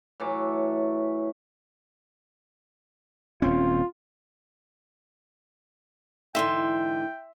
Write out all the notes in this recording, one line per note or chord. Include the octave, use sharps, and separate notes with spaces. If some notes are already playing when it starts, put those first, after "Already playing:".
A2 E3 F#3 D6
D#1 C4 C#4 F4
G#2 D3 E3 E5 G5 C6